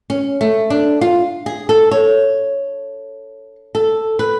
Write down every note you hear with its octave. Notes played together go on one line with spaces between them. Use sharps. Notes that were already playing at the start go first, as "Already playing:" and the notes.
C#4
A3
D4
F4
G#4
A4
C#5
A4
B4